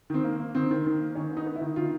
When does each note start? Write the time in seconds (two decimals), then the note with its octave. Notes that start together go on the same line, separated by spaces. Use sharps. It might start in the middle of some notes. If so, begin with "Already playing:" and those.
0.10 D#3 C4
0.24 A#3
0.40 A#3
0.55 D#3 C4
0.71 D#3
0.86 D#3
1.00 A#3
1.15 D#3 C#4
1.31 B3
1.37 D#4
1.46 B3
1.56 E4
1.61 D#3
1.76 D#3 F4